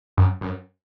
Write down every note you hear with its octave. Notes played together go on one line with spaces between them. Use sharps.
F#2
F#2